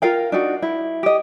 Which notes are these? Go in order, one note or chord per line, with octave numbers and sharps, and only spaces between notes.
F4 A#4 F5 G5
D4 D#4 F#4
E4
G4 D#5